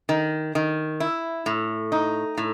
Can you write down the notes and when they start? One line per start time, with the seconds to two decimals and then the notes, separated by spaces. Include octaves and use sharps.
0.09 D#3
0.55 D#3
1.00 E4
1.46 A2
1.92 D#4
2.38 A2